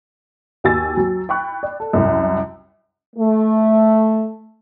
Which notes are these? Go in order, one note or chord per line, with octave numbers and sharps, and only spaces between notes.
D#2 F#4 G4 G#5 E6 A6
F#3
G5 B5 C#6 F#6
D5
A4
C2 F#2
A3